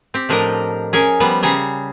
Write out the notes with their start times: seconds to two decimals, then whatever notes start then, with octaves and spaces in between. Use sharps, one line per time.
0.14 C4 G4
0.29 A2 F3 D4 A#4 D#5
0.93 C#4 G#4 A#4 G#5
1.20 F3 G3 B3
1.43 C#3 G3 G#4 A#5